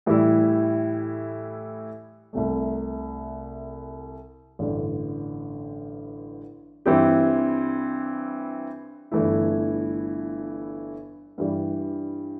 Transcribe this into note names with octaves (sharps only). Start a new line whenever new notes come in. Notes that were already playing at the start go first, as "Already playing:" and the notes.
A2 E3 G3 E4
C2 C3 A3
A1 G2 D3
G2 E3 C4 E4 G4
G1 G2 E3 A3 E4
G2 E3 G3